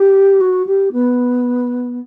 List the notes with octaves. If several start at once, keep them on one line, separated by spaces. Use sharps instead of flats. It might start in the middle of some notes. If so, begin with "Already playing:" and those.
Already playing: G4
F#4
G4
B3